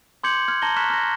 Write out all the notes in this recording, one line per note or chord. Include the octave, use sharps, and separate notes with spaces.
C6 D6 G6 G#6 C#7 F#7
F6 G#6
A5 A#5 A#6 G7
A#5 C#6 F6 F#6 B6 E7
F6 A#6